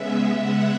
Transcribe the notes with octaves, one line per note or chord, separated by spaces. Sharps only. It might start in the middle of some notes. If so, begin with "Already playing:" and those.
Already playing: C#3 G#3 B3 E5
F#5